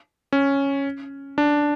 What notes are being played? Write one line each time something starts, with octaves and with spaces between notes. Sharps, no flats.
C#4
D4